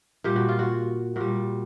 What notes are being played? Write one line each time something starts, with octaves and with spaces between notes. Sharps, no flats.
A#2 G3 G4
F#4
F4
F#4
A#2 G3 F#4